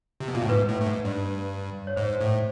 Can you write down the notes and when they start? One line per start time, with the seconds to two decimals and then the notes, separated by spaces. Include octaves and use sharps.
0.20 C3
0.28 B2
0.35 A#2
0.42 A2
0.49 G#2 B4
0.69 A2
0.82 A2
0.86 G#2
1.05 G2
1.87 C#5
1.96 G#2 C5
2.21 A2